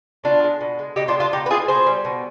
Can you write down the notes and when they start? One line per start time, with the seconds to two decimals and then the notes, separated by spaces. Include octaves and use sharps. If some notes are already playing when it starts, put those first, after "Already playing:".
0.24 B2 D4 F4
0.43 G#3
0.61 B2
0.79 G#3
0.96 B2 D#4 G4
1.08 D4 F4
1.14 G#3
1.20 D4 F4
1.32 B2 D#4 G4
1.46 B4
1.50 G#3 F4 G#4
1.68 B2 G#4 C5
1.87 G3
2.05 B2